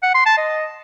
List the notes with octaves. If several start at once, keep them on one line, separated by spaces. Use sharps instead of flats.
F#5
C6
A5
D#5